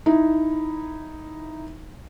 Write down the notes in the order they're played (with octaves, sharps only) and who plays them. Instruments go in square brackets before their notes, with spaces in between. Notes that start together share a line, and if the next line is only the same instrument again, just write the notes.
[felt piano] D#4 E4